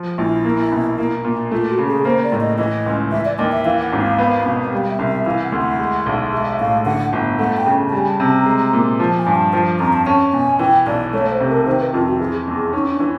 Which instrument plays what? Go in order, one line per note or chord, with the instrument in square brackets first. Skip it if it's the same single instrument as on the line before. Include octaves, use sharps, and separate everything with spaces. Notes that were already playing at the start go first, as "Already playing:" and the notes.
Already playing: [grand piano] F3
[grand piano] A#1 [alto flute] E4
[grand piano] A#3
B2
A#3
A#2
[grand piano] A3 [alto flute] F4
[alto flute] F#4
[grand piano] C#3
[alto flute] G#4
[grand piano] A#3 [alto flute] C5
[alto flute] D5
[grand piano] A2
[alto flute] D#5
[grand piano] E3 [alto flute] D#5
[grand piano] C#2
[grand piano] E3 [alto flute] E5
[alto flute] D5
[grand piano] D#2 [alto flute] D#5
[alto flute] E5
[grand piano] E3 [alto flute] F5
[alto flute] F#5
[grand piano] G#1
[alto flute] F5
[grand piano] B3
B2
[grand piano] G3 [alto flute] F5
[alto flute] E5
[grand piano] C2
[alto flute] E5
[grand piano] E3 [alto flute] F5
[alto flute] F#5
[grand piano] D2
[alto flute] F#5
[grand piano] G#3
B1
[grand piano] G#3 [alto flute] E5
[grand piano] A2 [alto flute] F5
[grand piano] D3 [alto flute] F#5
[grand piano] G1
[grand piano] A3 [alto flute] F#5
[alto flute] G5
[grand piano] C#3
[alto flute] A5
[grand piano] G3 [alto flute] G#5
[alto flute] A5
[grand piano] C3 [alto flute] A5
[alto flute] A#5
[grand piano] G#3
A#2
[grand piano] F3 [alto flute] A5
[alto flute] G#5
[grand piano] G2
[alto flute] A5
[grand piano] F3 [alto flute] A5
[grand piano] F2 [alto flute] A#5
[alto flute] A5
[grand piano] C#4 [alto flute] A5
[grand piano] B2 [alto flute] G#5
[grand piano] E3 [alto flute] G5
[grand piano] B1 [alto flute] D5
[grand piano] A3 [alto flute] C#5
[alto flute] C5
[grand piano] C3
[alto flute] A#4
[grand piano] D#3 [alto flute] C5
[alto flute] B4
[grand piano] F2 [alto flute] F4
[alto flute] F#4
[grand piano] E3 [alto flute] G#4
[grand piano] E2
[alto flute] G#4
[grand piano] C#4 [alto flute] D#4
[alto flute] D4
[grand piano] E3